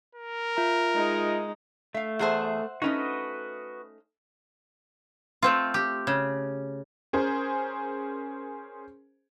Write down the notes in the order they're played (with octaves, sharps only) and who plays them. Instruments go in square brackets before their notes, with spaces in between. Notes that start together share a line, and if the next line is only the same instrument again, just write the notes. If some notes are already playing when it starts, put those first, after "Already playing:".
[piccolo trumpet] A#4
[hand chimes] F4 E5 A#5
[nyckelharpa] G#3 D#4
[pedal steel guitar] A3 [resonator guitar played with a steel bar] E5 F5
[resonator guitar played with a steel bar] E2 G#4 A5 [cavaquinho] C5 E5 F#5
[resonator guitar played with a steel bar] A3 C#4 D#4 [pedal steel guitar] F#4 B4 D#5
[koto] A3 C4 F4
G4
C#3
[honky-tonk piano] C#4 G#4 A#4 C5